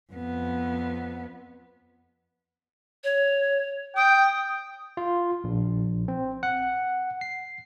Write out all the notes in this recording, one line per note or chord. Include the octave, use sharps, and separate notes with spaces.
F2 B3
C#5
G5 D#6
F4
A#1
C4
F#5
C7